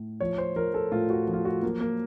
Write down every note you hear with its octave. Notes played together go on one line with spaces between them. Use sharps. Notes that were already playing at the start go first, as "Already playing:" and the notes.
Already playing: A2
F3 C#5
C5
F3 A#4
A4
A2 F4
F#4
F3
F4
F#4
F#3 A#3
A#3